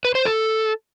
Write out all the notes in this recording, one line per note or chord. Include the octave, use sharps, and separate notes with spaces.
B4
C5
A4